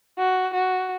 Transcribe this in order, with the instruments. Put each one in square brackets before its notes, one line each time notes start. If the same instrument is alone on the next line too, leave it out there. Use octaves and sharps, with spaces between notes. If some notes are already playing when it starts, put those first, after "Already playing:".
[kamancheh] F#4
F#4